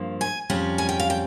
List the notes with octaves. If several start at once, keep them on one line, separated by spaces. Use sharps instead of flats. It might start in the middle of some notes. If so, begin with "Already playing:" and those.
Already playing: G2 F3 A#3
G#5
F2 C3 G3 C#4
G#5
G5
F5
G5